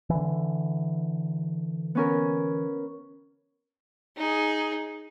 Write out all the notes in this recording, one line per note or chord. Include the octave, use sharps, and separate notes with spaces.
D3 E3
B3 C#4 A#4
D#4 G#4